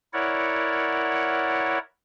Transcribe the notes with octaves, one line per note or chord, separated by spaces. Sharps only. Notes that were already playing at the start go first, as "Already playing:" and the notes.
E4 A#4 C#5 D5 F#5